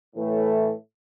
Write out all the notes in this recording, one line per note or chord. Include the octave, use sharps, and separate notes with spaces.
A2 E3 A3